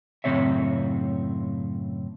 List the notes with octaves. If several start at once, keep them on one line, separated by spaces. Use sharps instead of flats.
F#2 A2 C#3 C4 C#5 E5